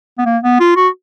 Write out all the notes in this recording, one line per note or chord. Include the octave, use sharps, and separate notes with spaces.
B3
A#3
B3
F4
F#4